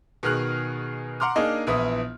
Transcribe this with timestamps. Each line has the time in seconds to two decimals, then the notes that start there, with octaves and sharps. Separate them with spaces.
0.23 B2 D#3 G#4 F6 F#6
1.20 F#5 A#5 C6 D6 F6
1.36 A#3 D4 D#4 G#4 D#5
1.67 A#1 E3 B3 E4 D#6